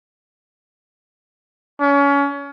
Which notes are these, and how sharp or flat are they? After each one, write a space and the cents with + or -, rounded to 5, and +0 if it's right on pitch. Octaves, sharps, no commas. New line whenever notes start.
C#4 +30